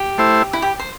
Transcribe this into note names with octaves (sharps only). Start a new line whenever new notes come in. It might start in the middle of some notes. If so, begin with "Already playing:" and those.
Already playing: G4
A3 E4 C5
E4
G4
C5